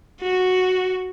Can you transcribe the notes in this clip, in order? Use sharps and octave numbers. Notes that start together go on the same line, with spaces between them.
F#4